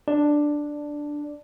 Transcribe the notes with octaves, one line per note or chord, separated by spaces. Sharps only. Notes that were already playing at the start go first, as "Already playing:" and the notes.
D4